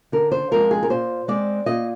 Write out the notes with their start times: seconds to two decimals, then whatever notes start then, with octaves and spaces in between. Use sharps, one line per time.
0.12 D3 A#4
0.32 C5
0.51 F3 G#3 C4 A#4
0.71 G#4
0.83 A#4
0.90 A#2 C5
1.28 G#3 C4 D5
1.66 A#2 D#5